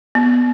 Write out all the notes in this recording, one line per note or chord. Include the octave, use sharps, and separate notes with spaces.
B3